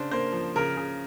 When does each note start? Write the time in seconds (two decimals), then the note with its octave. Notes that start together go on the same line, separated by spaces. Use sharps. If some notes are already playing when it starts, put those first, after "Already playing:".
Already playing: C#3 D4 C5
0.11 A#3 C5
0.32 F3
0.56 C#3 A#4
0.77 C#3